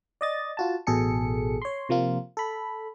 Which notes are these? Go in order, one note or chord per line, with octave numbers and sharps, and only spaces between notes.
D5 D#5 A6
F4 F#4 A5
A1 B2 G#4 A4 C#7
C#5 C6
C3 F3 A#3 F4
A4 B5